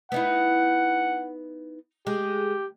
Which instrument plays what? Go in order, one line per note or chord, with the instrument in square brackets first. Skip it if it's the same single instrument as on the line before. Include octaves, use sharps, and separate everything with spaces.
[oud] B3 D#4 E4 [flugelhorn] F#5
[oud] G#3 [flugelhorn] G4